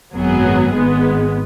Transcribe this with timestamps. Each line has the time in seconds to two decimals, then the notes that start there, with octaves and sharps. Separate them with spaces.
0.14 G#1 F#2 F#3 B3 G#4
0.72 G#1 G#2 G#3 B3